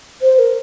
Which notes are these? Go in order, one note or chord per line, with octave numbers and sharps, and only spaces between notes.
C5
A#4